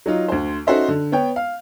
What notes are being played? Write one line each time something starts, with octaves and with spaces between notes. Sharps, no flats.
F#3 D#4 F4
D2 C5
C#4 D#4 F#4 A4 C5 E5
D3
B3 C#5 G5
F5